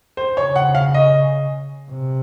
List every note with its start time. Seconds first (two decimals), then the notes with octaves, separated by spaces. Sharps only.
0.17 C5
0.37 C#3 C#5
0.56 F#5
0.75 F5
0.94 D#5
1.90 C3